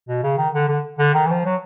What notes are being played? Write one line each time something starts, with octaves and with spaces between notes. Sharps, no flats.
B2
C#3
D#3
D3
D3
D3
D#3
E3
F3
F#3